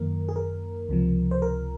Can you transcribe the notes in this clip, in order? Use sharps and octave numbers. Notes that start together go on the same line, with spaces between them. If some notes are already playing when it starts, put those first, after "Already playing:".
Already playing: F#2 D#3 A#3 A#4
G#4
A#4
C#2 C3 F3
C5
A#4